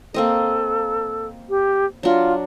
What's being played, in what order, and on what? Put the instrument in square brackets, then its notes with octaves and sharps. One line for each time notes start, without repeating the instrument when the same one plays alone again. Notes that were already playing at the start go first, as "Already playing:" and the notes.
[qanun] A#3 C4 D#5 [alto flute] A4
[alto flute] G4
[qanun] F#3 D4 [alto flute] F4